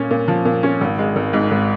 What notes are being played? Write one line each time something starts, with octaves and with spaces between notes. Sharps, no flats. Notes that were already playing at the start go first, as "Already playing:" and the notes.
Already playing: A#2 C#4
A#2
F3
A#2
C#4
G#1
G#3
G#1
G#2
G#1